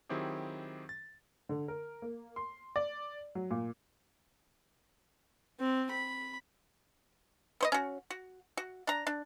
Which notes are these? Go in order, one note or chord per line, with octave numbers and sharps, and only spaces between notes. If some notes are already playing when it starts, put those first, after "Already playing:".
D#3 F#3 C4 E4 G4 G#4
A6
D3
A#4
A#3
C6
D5
F#3
A#2
C4
B5
B3 C5 D#5
C#4 F#4
F#4
F#4
D4 A#5
D4